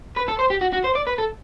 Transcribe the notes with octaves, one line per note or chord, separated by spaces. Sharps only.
B4
A4
C5
G4
F#4
F#4
C5
D5
B4
A4